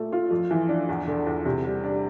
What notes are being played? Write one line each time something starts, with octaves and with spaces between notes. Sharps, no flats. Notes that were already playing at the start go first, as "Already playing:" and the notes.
Already playing: A#2 A3
F4
F2
E3
D4
E2
D3
E2
C3
G3
D4